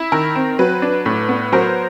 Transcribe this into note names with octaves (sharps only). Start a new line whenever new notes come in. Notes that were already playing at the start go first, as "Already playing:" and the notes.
Already playing: E4
D#3 A#4
C4
F#3 B4
D4
A2
B3
F#3 A#4 C5